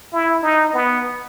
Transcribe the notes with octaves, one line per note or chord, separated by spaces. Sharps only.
E4
D#4
B3